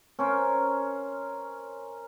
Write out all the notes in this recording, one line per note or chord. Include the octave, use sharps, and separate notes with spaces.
C#4 A#4 C5